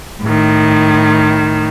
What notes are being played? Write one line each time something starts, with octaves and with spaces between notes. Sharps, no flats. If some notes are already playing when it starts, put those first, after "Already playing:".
A2 D#3